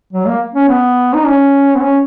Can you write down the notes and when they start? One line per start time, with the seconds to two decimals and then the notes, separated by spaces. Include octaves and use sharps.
0.13 F#3
0.27 A#3
0.55 C#4
0.68 B3
1.14 D#4
1.26 C#4
1.75 B3
1.81 C#4